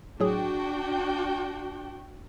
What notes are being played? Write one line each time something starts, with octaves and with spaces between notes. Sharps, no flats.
A2 F#3 D4 F#4 G#4 G5